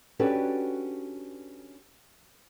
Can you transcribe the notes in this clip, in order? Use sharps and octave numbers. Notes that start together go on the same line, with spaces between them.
C#4 D4 F#4 G4 A4 B4